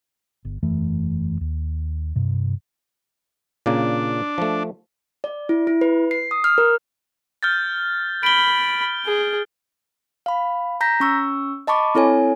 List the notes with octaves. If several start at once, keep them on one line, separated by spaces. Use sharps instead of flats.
G1
E1 F#2 E3 A3
D#2
G2 C3
A#2 C#3 A#3 D4
F3 A3
D5
E4
E4
B4
C7
D#6
F6
A#4
F6 G6 A6
B5 D7 G7
G#4
F5 B5
A#5 G6 A#6 B6
C#4 C#6 E6
D#5 A5 B5 C#6 D6
C4 E4 A4 C#5 G#5